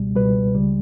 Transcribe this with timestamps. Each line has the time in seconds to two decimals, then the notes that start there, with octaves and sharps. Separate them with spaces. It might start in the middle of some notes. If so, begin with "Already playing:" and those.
Already playing: C#2 B2 G3
0.15 C#2 B2 G3 B4
0.54 C#2 C#3 G3